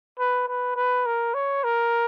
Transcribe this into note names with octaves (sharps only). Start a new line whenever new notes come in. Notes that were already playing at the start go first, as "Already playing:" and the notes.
B4
B4
B4
A#4
C#5
A#4